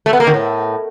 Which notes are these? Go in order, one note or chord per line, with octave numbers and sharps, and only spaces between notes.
A3
B3
A#3
D#3
A2